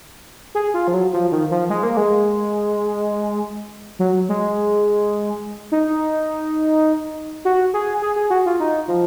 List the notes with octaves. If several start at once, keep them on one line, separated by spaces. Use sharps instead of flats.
G#4
F4
F3
F#3
F3
D#3
F3
G#3
A#3
G#3
F#3
G#3
D#4
F#4
G#4
G#4
G#4
F#4
F4
D#4
F3